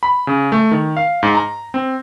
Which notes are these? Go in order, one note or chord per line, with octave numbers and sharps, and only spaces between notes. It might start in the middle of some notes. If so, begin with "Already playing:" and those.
B5
C#3
A3
D#3
F5
G#2
A#5
C4